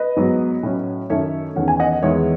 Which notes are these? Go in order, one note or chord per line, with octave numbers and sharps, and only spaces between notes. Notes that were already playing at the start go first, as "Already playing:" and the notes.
Already playing: B4 D#5
G#2 F#3 B3
A2 F#3 C#4
F#2 D#3 A3 C#4 C#5 E5
E2 D#3 A3 C#4 F#5
G#5
D#5 F#5
E2 D#3 G#3 C#5 E5